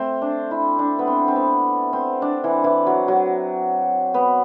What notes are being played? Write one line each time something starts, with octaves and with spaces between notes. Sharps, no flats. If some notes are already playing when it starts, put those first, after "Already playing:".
Already playing: A3 C4
D4
E4
D4
B3
C4
C4
B3
C4
D4
E3
E3
F#3
F#3
B3